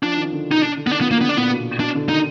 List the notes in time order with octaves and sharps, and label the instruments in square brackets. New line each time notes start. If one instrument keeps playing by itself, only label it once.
[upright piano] F3 [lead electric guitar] D4
[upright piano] D#3
D3
[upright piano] B2 [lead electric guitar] D#4
[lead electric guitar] D4
[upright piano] D3
[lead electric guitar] B3
[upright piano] D#3 [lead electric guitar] D4
[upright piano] F3 [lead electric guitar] B3
[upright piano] D#3 [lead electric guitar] A#3
[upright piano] D3 [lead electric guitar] B3
[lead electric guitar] D4
[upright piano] A#2 [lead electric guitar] B3
[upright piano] B2
[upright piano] B2 [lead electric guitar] D4
[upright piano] D3
[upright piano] D#3 [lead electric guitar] D#4